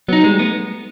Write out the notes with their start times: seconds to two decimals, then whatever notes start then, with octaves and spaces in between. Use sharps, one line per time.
0.08 F#3 B3 D#4
0.23 G3 G#3
0.39 A3 B3